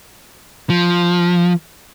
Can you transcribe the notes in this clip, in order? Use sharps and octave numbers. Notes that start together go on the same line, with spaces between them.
F3